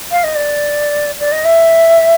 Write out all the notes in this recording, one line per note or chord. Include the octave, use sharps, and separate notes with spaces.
F5
D#5
D5
D5
D#5
E5